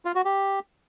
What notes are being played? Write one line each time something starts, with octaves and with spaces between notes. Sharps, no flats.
F4
F#4
G4